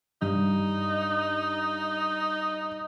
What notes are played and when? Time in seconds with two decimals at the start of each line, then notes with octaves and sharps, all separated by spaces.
0.22 G2 D#4